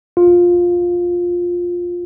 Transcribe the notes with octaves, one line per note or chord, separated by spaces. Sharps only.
F4